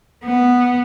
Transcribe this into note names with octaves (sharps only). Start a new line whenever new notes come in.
B3